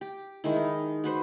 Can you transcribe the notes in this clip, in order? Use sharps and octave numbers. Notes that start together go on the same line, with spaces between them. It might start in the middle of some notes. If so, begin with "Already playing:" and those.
G4
D#3 G#3 E4
D#4
F#4 B4 C5